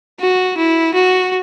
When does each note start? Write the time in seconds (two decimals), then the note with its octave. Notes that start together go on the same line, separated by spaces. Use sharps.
0.20 F#4
0.57 E4
0.94 F#4